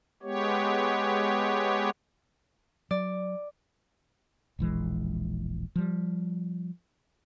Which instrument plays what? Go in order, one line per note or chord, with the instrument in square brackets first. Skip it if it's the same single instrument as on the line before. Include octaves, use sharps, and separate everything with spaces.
[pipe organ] G#3 B3 G4 C#5
[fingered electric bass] F#3 [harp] D5
[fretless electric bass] E1 A#1 E3 G#3
F3 G3